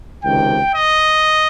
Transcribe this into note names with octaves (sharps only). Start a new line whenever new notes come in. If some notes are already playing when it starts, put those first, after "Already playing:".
C#2 C3 D#3 G5
D#5